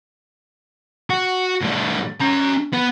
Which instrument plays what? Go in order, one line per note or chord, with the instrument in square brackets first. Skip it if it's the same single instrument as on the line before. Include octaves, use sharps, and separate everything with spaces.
[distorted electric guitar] F#4
A2 G3
C#4 A#5
B3